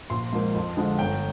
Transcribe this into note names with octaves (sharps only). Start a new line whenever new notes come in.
A#1 C6
G#2 F3 A#3
F2
D3 F3 G#3
G1 G5